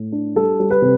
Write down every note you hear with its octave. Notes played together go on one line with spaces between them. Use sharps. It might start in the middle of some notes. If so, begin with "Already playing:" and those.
Already playing: A2
D4
G3 A4
G3
B4
C3